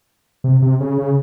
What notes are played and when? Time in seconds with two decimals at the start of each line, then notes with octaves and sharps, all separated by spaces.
0.44 C3
0.62 C3
0.80 C#3
0.98 C#3